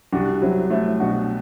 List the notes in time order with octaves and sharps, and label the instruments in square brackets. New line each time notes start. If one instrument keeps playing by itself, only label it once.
[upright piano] C2 [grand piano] D4 F#4
[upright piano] F#3 [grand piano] C4 E4
[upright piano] A3 [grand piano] C4 E4
[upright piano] B2 [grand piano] D4 F#4